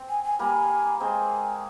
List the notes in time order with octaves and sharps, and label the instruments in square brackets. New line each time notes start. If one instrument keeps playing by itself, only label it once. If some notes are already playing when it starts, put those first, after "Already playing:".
Already playing: [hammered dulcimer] C4
[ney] G#5
G#5
[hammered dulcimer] G3 A#3 [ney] G#5
[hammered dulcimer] G#3 C4 [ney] G#5